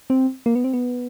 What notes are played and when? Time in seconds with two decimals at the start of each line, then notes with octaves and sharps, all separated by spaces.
0.10 C4
0.46 A#3
0.55 B3
0.64 C4
0.73 B3